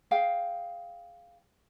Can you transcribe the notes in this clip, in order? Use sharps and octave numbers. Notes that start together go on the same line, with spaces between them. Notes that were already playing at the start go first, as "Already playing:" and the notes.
G#4 F5 G5